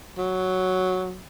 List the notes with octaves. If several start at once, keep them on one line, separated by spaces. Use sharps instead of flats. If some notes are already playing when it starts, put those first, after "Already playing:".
F#3